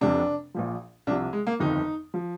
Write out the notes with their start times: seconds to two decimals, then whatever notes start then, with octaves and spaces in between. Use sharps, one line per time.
0.01 F1 F2 C3 D4
0.54 A#1 A#2 F3
1.07 C2 C3 F3 D4
1.33 G#3
1.47 A#3
1.60 G1 F2 D#3 D#4
2.14 F3